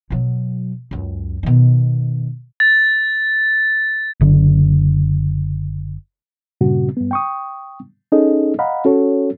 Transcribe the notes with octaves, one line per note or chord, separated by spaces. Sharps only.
B2 F#3
C#2 F#2
B2 D#3
A6
F#1 D3
G2 A#2 C#3 F#4
G2 B3
G5 C#6 D#6
C#4 D#4 G#4 A4 D#5
D#5 F5 F#5 A#5 B5
C#4 F#4 A4 C#5